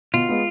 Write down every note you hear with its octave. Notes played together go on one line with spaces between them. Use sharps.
B2 F4
G#3 B3